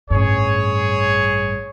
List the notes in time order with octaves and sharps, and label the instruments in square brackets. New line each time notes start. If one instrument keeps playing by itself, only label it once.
[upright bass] A1 G2 [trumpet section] G#4 C#5